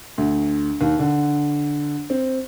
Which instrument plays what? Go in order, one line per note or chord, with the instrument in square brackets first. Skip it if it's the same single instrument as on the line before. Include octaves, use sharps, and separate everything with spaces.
[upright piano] D2
D#2
D3
C4